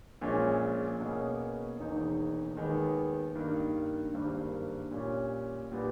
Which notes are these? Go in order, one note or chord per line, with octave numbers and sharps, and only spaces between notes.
A#1 A#2 G#3 C#4
B2 A#3 C#4 G#4
E1 E2 D#3 A#3 D#4
D#2 D#3 G#3 B3
G2 D#3 A#3
G#1 G2 G3 A#3
A#2 G3 C#4
A#2 G3 B3